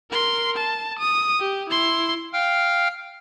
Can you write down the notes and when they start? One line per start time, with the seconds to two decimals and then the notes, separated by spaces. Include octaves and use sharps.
0.11 A#4 C6
0.57 A5
0.99 D#6
1.40 G4
1.70 E4 C6
2.33 F5 G5 F6